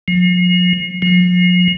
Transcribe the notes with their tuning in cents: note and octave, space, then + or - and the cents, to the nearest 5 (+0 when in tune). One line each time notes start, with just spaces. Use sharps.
F3 +45
F3 +45